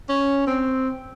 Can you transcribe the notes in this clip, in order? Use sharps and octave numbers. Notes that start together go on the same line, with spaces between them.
C#4
C4